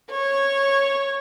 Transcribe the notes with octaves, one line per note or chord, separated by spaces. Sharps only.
C#5